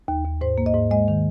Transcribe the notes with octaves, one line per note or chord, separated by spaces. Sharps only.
D#2
D#2
G#2 C5
A#3
D#5
G#2
G#3 D#5
D#3